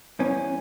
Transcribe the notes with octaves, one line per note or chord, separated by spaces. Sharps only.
G2 E3 B3 C#4